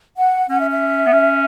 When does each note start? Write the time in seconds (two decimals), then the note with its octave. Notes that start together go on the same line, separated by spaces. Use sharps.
0.17 F#5
0.49 C#4 F#5
0.60 E5
0.70 E5
1.07 B3
1.13 C#4